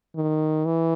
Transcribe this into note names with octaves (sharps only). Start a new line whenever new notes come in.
D#3
E3